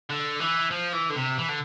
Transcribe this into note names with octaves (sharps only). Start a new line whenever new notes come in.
D3
E3
F3
E3
D3
C3
E3
D3